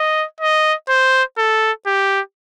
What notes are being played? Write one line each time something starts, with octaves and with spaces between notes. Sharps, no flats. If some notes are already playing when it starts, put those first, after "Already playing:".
Already playing: D#5
D#5
C5
A4
G4